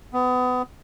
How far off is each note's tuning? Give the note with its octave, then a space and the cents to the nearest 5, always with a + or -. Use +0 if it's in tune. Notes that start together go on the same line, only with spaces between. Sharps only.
B3 +25